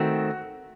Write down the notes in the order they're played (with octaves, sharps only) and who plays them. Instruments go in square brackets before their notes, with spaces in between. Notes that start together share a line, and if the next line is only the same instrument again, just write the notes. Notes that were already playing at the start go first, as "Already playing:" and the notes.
Already playing: [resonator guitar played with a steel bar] D#3 A3 C4 [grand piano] F#4